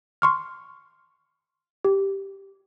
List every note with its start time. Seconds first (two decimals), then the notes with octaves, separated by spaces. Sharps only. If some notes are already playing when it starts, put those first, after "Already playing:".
0.22 C6 C#6 F6
1.85 G4